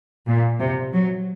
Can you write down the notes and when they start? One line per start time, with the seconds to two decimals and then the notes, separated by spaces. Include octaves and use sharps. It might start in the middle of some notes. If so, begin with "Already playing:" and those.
0.27 A#2
0.60 C3
0.93 F#3